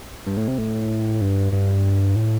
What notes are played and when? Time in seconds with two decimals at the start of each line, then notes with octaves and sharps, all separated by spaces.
0.26 G2
0.37 A2
0.48 C3
0.58 A2
1.21 G2
1.52 G2
2.16 A2